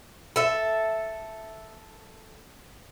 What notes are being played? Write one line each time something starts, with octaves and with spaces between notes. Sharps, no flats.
A4 E5